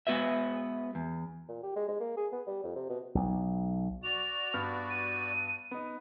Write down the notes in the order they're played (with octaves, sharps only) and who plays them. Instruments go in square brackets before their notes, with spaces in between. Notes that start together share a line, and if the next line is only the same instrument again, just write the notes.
[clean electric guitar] G#3 B3 F#4 B4 E5
E2
[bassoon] A#2
G4
G#3
G#3
A#3
G#4
B3
G3
F2
C3
B2
[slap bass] B1
[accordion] F#4 D5 [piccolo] F7
[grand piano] G2 B3 F6
[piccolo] D#7
[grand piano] B3 D#4